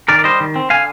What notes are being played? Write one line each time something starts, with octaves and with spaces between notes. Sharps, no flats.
D#3 A#4 D5
D5
G3 C5 D#5
D#3
C4
D3 F5 G#5